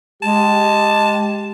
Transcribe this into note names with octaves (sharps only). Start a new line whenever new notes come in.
G#3 G4 A5